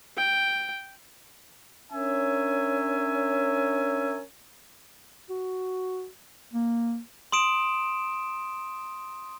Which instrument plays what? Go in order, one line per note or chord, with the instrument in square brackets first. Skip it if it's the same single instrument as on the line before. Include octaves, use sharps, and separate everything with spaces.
[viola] G5
[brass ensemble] C#4 D4 A#4 C#5 E5 G#5
[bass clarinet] F#4
A#3
[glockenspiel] C6 D#6 D7 E7